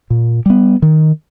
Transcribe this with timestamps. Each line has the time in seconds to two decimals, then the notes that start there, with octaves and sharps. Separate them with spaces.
0.10 A#2
0.46 G3 B3
0.82 D#3